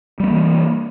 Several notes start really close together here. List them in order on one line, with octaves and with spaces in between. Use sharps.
G3 B3 A#3 E3